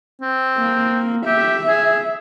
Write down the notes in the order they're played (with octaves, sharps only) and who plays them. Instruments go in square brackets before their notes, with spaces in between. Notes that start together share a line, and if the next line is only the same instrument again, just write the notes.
[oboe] C4
[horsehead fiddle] A#3
[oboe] G4 [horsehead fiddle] E5
[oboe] G#4